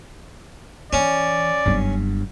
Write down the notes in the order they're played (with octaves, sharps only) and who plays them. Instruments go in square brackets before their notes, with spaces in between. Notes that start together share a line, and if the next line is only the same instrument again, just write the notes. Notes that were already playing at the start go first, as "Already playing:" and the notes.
[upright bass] E3 [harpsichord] C#4 [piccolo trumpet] D5
[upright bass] F#1 B3 [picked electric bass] G2